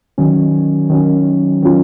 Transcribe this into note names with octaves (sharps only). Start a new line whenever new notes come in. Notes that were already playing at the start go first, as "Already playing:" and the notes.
D#3 F#3 C#4
D#3 F#3 C#4
D#3 F#3 C#4 F4